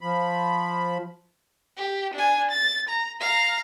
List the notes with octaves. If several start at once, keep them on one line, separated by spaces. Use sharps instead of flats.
F3 B5
G4
D4 G#5
A6
A#5
F5 A#5